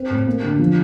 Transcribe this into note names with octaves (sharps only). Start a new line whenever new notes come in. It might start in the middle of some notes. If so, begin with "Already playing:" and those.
Already playing: C4
A2
A#3
D3
F3